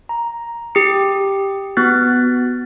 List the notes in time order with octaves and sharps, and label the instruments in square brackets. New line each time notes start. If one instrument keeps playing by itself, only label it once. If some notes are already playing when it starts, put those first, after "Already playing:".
[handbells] A#5
G4 D#6 C#7
B3 F#4 F#6 A6